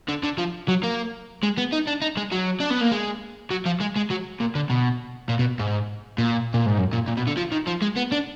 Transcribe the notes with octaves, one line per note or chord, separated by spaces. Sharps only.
D3
D3
F3
F#3
A#3
G#3
B3
D#4
D4
D#4
G#3
F#3
D4
B3
A#3
G#3
F#3
F3
G#3
G#3
F#3
A#2
D3
B2
A#2
B2
G#2
A#2
A#2
G#2
F#2
A#2
A#2
B2
D3
F3
D#3
F3
G#3
B3
D4